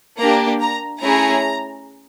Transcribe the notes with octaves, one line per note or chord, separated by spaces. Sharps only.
A#3 D4 G4 A#5
A#5
A3 C#4 E4 G#4 A#5